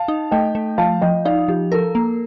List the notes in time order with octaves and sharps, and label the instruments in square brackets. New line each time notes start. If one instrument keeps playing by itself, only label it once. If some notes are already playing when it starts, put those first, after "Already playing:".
Already playing: [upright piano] F5 A5
[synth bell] D#4
[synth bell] A3 [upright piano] D#5 G5
[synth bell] A3
[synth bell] F3 [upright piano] F5 A5
[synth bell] F3 [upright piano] D#5 G5
[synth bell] D#4 [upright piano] D5 F5
[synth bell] F3 [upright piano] G4
[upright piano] A4 [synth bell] A#4
[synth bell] A#3